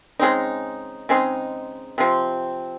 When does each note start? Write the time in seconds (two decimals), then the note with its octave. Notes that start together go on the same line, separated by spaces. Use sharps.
0.20 C#3 G#3 C4 D#4
1.09 C#3 G#3 C4 D#4
1.98 C3 F3 C4